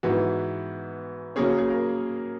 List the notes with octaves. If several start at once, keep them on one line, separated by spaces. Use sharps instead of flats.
G#2 E3 B3 F#4
C#3 F#3 A#3 C#4 G#4
G#4
A#4